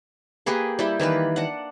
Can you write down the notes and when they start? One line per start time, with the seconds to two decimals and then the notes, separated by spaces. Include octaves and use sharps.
0.46 A#3 G4 G#4 B4
0.79 G3 E4 G4
1.00 D#3 E3 A#3 B4
1.36 D4 F#5